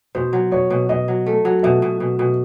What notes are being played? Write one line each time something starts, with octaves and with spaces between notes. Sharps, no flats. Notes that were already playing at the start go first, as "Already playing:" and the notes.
B2 C5
F#3
B2 C#5
B2
B2 D#5
F#3
A3
F#3
B2 E5
B2
B2
B2